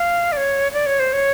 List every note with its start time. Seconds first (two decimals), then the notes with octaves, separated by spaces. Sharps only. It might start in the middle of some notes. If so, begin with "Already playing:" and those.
Already playing: F5
0.32 D5
0.37 C#5
0.73 D5
0.86 C#5
0.99 C5
1.13 C#5